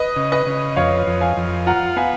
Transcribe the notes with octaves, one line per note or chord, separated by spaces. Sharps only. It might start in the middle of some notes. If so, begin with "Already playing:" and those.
Already playing: B4 D#5
C#3
B4 D#5
C#3
F2 C#5 F5
F2
F5 G#5
F2
F4 F#5 A#5
B3 F5 G#5